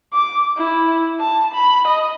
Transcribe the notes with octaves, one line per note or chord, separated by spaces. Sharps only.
D6
E4
A5
B5
D#5